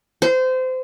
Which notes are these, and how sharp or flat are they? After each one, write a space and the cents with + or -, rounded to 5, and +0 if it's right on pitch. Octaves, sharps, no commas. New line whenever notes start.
C5 -25